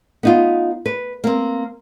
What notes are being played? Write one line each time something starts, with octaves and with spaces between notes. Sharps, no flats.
B3 D#4 F4
B4
A#3 C4